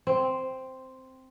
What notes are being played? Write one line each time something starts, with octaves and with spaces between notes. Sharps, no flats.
C4